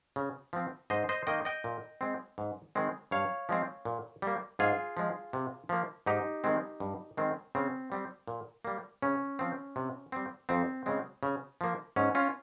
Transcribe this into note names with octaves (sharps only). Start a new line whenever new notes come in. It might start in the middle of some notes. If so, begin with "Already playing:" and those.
C#3
F3 C4
G#2 C5 D#5
C5 D#5
D#3 A#3 D#5 G5
D#5 G5
A#2
G#3 C4
G#2
D#3 G#3 C4
G2 C#5 F5
F3 G#3 C4
A#2
G3 A#3
G#2 F4 G#4
F3 G#3
C3
F3 A#3
G#2 D#4 G4
D#3 G#3 C4
G2
D#3 G#3 C4
C#3 C4
G3 C4
A#2
G3 A#3
C#3 C#4
F3 C4
C3
G3 C4
F2 C4
C#3 G#3 C4
C#3
F3 A#3
G#2 C#4
C#4 F4